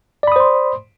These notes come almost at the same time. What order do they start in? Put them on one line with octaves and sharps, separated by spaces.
D5 B5 D#6 C5 C6